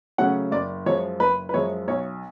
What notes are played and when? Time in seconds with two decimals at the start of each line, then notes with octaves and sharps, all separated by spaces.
0.18 C#3 F#3 A3 C#4 F#5
0.51 F#1 D5
0.86 F#2 F3 G#3 C#5
1.20 F#1 B4
1.49 B4
1.54 F#2 F3 G#3 C#5
1.88 B1 C#5